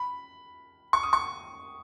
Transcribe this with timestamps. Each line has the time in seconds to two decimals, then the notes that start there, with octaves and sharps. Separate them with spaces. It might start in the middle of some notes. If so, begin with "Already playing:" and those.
Already playing: B5
0.93 C#6
1.03 D#6
1.13 C#6